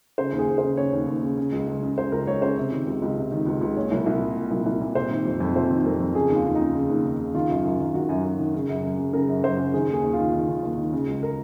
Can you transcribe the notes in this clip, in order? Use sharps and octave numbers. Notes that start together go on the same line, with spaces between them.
C#3 C5
D#2
G#4
D#2
C#3 C5
C#3 C#5
D#2
D#2
C#3
C#3
C#2
C#2
C#3
C#3 C5
C#2 A#4
C#2 C#5
C#3 C5
C3
D#3
C#2
C#2
C3
D#3
C#2
C#2
A#2 C#5
C2
C2
A#2
A#2
C2
C2
A#2
C3 C5
D#3
F2
F2
C3 C5
D#3
F2 A#4
F2
C#3 G#4
D#2
F4
D#2
D#4
C#3
C#3
D#2
D#2
C#3
D#3 F4
F#2
F#2
D#3
D#3 F#4
F#2
F#2
D#3
C#3
F#2
F#2
C#3
C#3 A#4
F#2
F#2 C5
C#3
D#3 G#4
D#2 G#4
D#2
F4
D#3
D#3
D#2
D#2
D#3
C#3
C#2
A#4